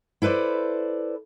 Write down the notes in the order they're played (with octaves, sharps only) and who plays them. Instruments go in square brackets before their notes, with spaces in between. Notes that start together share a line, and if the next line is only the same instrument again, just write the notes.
[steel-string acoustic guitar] E4 A4 B4 C5 D5